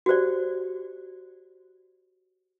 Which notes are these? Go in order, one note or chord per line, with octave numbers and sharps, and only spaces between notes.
F#4 G4 C5 D5